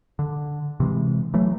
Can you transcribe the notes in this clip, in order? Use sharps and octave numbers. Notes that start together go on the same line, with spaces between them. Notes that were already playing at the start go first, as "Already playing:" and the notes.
D3
C3 E3 G#3
E3 F#3 A3